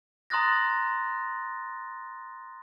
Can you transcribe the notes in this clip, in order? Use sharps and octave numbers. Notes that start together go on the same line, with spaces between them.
A#5 C6 D#6 F#6 A6 A#6